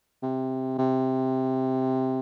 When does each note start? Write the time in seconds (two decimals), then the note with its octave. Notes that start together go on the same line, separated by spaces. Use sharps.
0.22 C3
0.78 C3